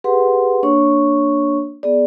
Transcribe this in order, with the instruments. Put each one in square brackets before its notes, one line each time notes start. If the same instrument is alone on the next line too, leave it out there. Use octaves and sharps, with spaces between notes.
[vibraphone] G4 G#4 B4 F#5 C6
A#3 D4 C#5 C#6
B3 G#4 D5